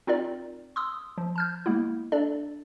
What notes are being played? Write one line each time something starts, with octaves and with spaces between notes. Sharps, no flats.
C4 D#4 F4 A#4 D5
C6 D#6 E6
F3
A5 F6 G6
G#3 A#3 B3 E4
D4 A4 D5